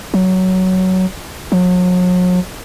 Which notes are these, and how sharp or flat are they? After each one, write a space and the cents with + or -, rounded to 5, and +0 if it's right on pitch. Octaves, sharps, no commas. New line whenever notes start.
F#3 +10
F#3 -40